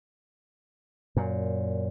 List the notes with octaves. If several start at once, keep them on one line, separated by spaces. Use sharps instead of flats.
F#2 A#2